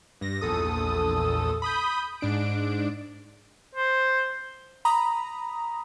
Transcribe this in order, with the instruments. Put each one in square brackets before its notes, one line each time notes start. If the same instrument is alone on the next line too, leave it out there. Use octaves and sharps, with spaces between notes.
[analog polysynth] G2 A#6
A#1 E2 A4 D#6
B5 D#6 G6
G#2 D4 D7
[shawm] C5
[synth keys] A#5 B5 D#6